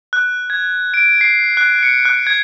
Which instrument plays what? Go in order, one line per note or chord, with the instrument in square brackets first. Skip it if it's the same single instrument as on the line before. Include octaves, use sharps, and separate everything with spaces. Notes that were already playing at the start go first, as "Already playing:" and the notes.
[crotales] F#6
G#6
D7
C7
F#6
C#7
F#6
G#6